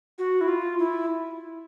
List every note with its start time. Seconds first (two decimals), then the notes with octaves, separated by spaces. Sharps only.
0.19 F#4
0.41 E4
0.48 F4
0.79 E4